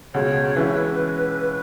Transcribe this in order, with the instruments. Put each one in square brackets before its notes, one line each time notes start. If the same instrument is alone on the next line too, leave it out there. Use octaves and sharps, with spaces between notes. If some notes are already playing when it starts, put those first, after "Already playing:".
[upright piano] C#2 B2 G#3 [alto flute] C#5
[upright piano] E3 G#3 C#4 E4 [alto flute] B4